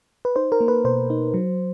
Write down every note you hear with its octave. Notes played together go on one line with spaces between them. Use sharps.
B4
D#4 C5
A#4
A#3
B4
B2 C5
D#4
F#3